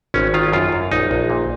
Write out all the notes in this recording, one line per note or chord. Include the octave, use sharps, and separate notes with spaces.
G#1 C#4
D#3 F4
F#2 F4
F#2
A#1 D#4
A#1
A#2